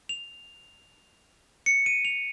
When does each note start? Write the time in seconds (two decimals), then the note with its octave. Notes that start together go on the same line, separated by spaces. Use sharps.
0.09 F7
1.66 C#7
1.86 D#7
2.05 F7